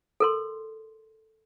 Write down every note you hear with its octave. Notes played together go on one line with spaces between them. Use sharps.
A4 A#4 C6